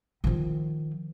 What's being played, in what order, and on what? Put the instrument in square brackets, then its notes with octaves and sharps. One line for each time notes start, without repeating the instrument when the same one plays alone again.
[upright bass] D#3 F3